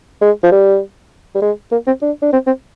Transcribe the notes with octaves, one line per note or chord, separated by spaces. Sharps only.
G#3
F3
G3
G3
G#3
A#3
C4
D4
D4
C4
C4